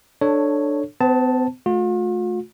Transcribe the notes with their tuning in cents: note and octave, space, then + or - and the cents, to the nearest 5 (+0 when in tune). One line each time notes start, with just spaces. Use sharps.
D4 +15 A4 +0 C#5 +0
B3 +45 C5 +0 A5 +0
A3 -25 F4 +45